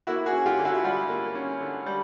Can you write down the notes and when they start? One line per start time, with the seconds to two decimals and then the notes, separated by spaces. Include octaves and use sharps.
0.07 A#3 E4 F#4
0.26 F#4 G#4
0.33 C#4
0.46 F4 G4
0.59 D3
0.65 E4 F#4
0.84 G3 F4
1.09 A#3
1.35 C#4
1.60 D3
1.86 G3